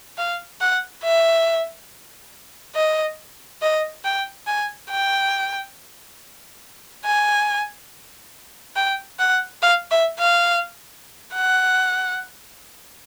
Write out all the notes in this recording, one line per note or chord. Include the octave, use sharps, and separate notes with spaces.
F5
F#5
E5
D#5
D#5
G5
G#5
G5
G#5
G5
F#5
F5
E5
F5
F#5